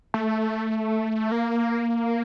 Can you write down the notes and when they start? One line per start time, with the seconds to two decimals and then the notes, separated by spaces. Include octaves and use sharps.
0.14 A3
1.32 A#3